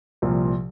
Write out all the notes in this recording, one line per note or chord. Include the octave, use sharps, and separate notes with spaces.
C2 A#2 F3